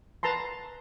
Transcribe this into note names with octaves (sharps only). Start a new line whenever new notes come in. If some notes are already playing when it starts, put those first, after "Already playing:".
B4 A5 A#5 C6